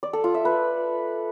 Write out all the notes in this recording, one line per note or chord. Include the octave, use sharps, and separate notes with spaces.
D5
A4
F4
E5
B4